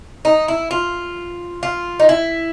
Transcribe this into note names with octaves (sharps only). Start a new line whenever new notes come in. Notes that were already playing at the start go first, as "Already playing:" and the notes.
D#4
E4
F4
F4
D#4
E4